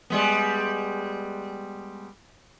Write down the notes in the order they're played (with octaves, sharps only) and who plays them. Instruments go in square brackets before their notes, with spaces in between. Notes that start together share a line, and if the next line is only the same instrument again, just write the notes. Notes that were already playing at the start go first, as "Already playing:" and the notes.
[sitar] G3 G#3 B3